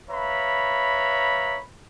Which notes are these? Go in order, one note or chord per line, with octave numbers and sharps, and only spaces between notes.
B4 C#5 E5 F5 A#5 B5